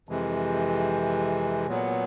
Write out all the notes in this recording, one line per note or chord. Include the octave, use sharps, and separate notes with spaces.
F2 C3 E3 G#3
A#2 F#3 B3